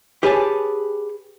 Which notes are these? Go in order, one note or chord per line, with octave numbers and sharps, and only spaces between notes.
G4 G#4 B4 C#5 G#5 A5